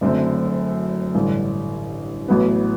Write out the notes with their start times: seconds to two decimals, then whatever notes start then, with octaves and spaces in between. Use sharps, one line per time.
0.01 F#1 F#2 D3 A3 C4
1.15 A1 G2 D3
2.28 A1 A2 F#3 B3